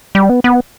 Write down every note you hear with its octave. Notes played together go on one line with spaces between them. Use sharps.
G3
B3
B3